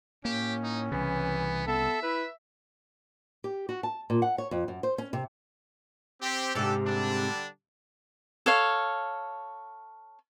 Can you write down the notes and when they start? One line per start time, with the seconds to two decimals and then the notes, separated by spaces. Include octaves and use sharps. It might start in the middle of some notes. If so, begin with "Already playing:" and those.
0.25 A2 A#3 C#4 G4
0.63 D#4
0.92 C2 C#3 E3 B3
1.68 B3 A4 E5
2.03 E4 B4
3.44 G4
3.69 F#4
3.83 A5
4.10 A#2
4.22 F#5
4.38 C#5
4.51 F2
4.68 F#2
4.83 C5
4.98 C#4
5.13 C3
6.20 C4 G4
6.55 G#2 C3 D4 G4 A4
6.86 D3 G3 D4
8.46 A4 C#5 F5